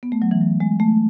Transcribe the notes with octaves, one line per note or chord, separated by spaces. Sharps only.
B3
A3
F#3
E3
F#3
G#3
A3